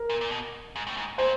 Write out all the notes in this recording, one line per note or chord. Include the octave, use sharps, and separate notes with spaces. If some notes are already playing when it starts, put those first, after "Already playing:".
Already playing: A#4
A#2
A#2
B2
G#2
A2
G#2
A#2 C5